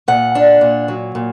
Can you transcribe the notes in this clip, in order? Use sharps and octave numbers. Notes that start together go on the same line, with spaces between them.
A#2 F#5
D4
A#2
F#3
A#2